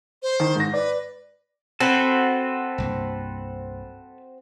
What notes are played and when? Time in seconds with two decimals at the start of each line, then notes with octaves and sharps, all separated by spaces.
0.23 C5
0.40 D#3
0.56 G#2 A#6
0.74 B4 D5
1.80 C4 F#4 A4 B4
2.78 C2 G2 A#3